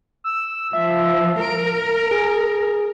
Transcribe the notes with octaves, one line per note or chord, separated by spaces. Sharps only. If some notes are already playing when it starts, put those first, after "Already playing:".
E6
F3 E5
A#4 D7
G#4